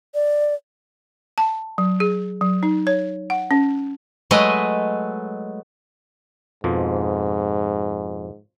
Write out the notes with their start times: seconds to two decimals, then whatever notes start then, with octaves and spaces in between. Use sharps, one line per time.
0.15 D5
1.38 A5
1.78 F#3
2.00 G#4
2.41 F#3
2.63 D#4
2.87 C#5
3.30 F#5
3.51 C#4
4.31 F#3 G#3 A3 B4 D#5
6.64 F2 G#2 B2 F3